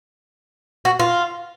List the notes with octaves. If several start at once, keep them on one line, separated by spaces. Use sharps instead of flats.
F#4
F4